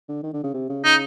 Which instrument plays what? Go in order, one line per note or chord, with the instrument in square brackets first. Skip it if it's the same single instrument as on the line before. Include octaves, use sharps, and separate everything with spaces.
[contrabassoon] D3
D#3
D3
C#3
C3
C#3
[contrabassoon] C#3 [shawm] D#4